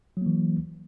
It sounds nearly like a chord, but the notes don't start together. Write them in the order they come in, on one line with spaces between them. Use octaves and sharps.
F#3 A#3 E3